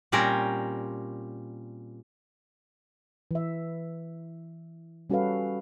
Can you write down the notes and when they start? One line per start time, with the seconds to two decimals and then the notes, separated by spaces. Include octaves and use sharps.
0.12 A#2 G3 C4 C#4 A#4
3.31 E3 E5
5.10 G3 C#4 F#4 A4 B4 F5